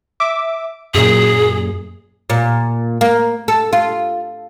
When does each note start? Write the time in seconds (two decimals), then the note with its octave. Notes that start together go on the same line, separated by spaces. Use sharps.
0.20 E5 D6
0.94 F#2 A#2 G#4
2.30 A#2
3.01 A#3
3.48 A4
3.73 F4